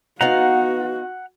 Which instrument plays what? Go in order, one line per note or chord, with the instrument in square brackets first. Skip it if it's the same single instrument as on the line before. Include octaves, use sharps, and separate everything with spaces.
[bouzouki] B3 D#4 F5 [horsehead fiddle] F#4 [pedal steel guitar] F#5 A#5